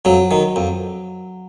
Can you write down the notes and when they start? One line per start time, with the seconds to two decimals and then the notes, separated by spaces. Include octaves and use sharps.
0.05 F2 F#3
0.31 D#3
0.56 F2